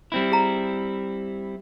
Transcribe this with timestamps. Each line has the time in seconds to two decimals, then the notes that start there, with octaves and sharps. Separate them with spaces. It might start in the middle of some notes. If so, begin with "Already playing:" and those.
0.12 G3 C4 E4
0.31 G#4 A#5